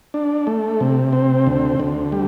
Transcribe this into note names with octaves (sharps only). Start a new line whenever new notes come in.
D4
A3
C3
C4
D2
D2
G3